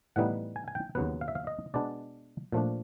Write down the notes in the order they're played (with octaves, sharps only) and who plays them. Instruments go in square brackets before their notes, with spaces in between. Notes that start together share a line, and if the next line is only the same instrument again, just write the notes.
[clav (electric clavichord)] A2 E3 G3 B3 D#4 F#5
G#5
G#5
G5
D#2 C#3 F#3 B3 F#5
F5
E5
F5
D#5
B2 G#3 B3 D4 D5
A#2 F3 A3 D4